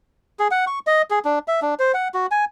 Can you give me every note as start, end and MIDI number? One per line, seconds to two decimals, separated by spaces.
0.39 0.48 68
0.51 0.65 78
0.67 0.79 85
0.87 1.02 75
1.10 1.19 68
1.25 1.39 62
1.48 1.60 76
1.62 1.74 62
1.79 1.92 72
1.94 2.08 78
2.14 2.26 66
2.31 2.45 80